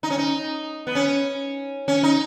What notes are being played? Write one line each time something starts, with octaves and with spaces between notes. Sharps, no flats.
D#4
C#4
D#4
B3
C#4
C#4
D#4